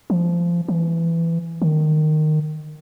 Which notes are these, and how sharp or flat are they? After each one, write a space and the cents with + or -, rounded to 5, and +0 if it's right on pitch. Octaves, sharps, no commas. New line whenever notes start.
F3 -20
E3 +15
D#3 -15